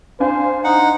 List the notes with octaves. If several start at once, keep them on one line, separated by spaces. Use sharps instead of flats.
D4 C5 F5 G#5
D#4 F#5